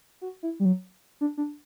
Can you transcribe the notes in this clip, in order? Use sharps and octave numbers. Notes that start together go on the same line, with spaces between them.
F#4
E4
G3
F#3
D4
D4